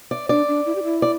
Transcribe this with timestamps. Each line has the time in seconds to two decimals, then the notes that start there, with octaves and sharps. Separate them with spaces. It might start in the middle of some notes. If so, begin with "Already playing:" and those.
0.11 D5
0.29 D4 D5
0.48 D4
0.66 E4
0.75 G4
0.83 E4
1.02 D5